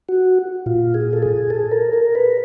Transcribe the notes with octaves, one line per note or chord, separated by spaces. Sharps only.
F#4
A#2 F4
G#4
A4
G#4
A4
A#4
A#4
B4